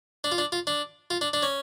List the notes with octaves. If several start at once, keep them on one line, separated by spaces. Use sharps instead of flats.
D4
F4
D4
F4
D4
F4
D4
D4
C#4